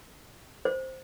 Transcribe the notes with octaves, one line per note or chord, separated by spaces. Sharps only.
C5